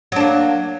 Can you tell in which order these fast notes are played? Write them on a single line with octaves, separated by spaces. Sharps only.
F#3 D4 A#3